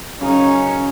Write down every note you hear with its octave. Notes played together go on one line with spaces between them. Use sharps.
F#2 C#3 C#4 D#4